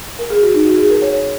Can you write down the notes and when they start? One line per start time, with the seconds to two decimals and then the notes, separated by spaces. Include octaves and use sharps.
0.19 A#4
0.30 G#4
0.42 F#4
0.54 D#4
0.65 F#4
0.77 G#4
0.90 A#4
1.02 C#5
1.13 C#5